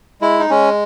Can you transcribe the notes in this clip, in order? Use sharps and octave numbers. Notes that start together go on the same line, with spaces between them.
G#3 E4
D#4
G#3 C#4